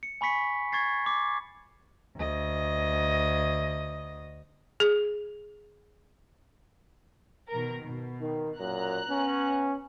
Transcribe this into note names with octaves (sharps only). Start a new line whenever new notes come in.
C#7
G#5 B5 C#6 B6 C#7
C#6 G#6 A6 C7
D6
D2 D#5
G#4
B2 D#3 A#4
B2
D#3
F#2 A#2 A#5 F#6
B3 C#4